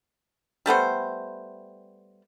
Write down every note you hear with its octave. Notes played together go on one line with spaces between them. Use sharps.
G3 A3 B3 C5